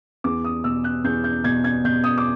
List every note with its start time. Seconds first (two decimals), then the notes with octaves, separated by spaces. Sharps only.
0.24 E2 D6
0.44 D#6
0.64 B2 E6
0.84 F#6
1.04 E2 G6
1.24 G6
1.44 B2 G#6
1.64 G#6
1.84 B2 G6
2.04 D#6
2.18 D6